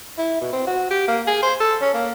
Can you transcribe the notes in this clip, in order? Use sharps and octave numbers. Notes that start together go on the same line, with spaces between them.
E4
B2
C4
F#4
G4
A#3
G#4
C5
A4
C#4
A#3